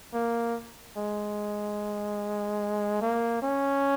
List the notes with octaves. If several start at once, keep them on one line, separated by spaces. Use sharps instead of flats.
A#3
G#3
A#3
C#4